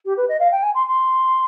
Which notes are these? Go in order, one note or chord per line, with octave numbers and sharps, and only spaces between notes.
G4
B4
D#5
F5
G5
G#5
C6
C6